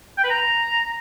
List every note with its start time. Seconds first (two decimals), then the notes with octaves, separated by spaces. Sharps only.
0.18 G5
0.24 B4
0.30 A#5